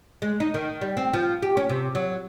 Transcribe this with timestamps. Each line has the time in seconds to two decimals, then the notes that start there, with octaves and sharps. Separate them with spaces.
0.22 G#3
0.40 D#4
0.54 D#3
0.81 G3
0.97 C4
1.13 F3
1.42 G4
1.57 C#4
1.69 C3
1.95 F#3